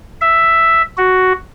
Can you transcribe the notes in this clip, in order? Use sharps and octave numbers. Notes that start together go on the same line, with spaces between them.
E5
F#4